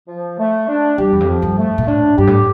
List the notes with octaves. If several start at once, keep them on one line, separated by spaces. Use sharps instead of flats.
F3
A3
D4
G2 G4
E2
F2
F3
G2
A3
A#2
A2 D4
G2 G4
A2